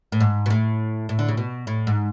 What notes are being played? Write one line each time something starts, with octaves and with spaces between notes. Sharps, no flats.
A2
G#2
B2
A2
A2
D3
C#3
B2
A2
G#2